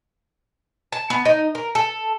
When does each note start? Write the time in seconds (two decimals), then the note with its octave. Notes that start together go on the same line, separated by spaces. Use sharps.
0.92 A5
1.10 B3
1.25 D#4
1.55 A#4
1.75 A4